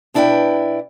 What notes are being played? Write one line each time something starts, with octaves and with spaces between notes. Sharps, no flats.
B2 D4 E4 G#4 B4 G5